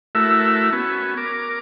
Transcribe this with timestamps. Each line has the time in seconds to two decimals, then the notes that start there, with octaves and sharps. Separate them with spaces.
0.15 A3 E4 F#4 A#4 E5
0.72 B3 C#4 F#4
1.17 A#4 D6